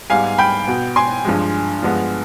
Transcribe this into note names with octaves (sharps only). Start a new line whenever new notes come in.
G#2 G3 B3 F5 G#5
G5 B5
B2 B3
G#5 C6
G2 F3 G#3
G2 F3 G#3 B3